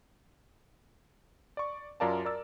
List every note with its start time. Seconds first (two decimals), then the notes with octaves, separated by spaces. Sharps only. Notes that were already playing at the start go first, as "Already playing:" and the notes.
1.57 D5 C#6
2.00 F#2 F4 A#4 D5 F5 A5
2.25 A#4 D5 E6 A6